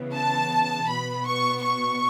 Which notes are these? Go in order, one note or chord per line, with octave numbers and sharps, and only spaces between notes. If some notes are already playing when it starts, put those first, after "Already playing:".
Already playing: C#3 E3 B3
A5
B2 B3 B5
C#6
C#6